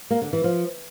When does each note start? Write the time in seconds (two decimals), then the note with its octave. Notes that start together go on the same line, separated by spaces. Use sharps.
0.10 A#3
0.22 D3
0.33 E3
0.44 F3